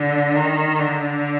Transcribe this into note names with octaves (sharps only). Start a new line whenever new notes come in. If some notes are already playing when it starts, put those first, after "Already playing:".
Already playing: D3
D#3
D3